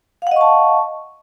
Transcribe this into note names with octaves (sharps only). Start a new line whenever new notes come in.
D#5 F5 F#5 A5 C#6